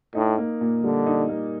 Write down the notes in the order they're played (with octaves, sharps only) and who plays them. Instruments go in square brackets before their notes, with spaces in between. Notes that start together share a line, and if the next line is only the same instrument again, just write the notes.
[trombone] A2 [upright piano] D#4
[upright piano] A#3
A#2
[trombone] D3 [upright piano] G3
[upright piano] D#4
A#3